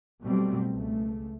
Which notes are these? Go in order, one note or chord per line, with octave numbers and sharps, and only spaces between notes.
B2 F#3 G3 A3 C4
C#2 A3